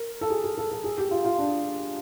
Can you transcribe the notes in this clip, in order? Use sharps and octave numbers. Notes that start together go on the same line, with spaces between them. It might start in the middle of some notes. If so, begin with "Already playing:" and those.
Already playing: A#4
A4
G#4
G#4
A4
A4
G#4
G4
F4
F4
D4